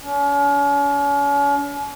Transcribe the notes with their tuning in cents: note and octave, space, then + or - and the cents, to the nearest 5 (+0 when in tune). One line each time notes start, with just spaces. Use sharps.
C#4 +40